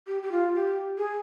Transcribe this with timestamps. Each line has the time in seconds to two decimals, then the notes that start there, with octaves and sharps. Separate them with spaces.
0.07 G4
0.23 G4
0.32 F4
0.55 G4
0.98 G#4